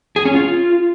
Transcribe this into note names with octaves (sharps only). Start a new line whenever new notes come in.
G#4
C#4
F4